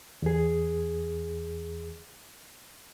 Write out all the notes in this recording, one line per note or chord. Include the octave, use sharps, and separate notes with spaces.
E2 G#4